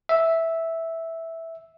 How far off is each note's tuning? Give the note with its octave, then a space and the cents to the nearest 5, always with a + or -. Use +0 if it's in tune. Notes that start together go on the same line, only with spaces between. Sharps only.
E5 -5